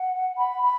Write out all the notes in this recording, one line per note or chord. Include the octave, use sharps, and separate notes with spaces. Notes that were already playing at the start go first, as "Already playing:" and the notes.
Already playing: F#5
B5
B5